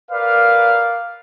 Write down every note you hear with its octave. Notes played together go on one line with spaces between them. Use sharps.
A#4 B4 D5 F5